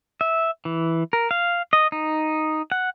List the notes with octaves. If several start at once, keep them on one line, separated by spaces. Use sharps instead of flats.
E5
E3
A#4
F5
D#5
D#4
F#5